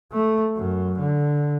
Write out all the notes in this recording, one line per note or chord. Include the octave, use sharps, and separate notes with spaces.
A3
F#2
D3